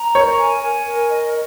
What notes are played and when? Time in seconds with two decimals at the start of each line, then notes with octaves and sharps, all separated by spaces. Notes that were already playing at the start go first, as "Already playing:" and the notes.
Already playing: A#5
0.15 A#4 C#5
0.39 G#5
0.62 G#5
0.86 A#4
1.10 D#5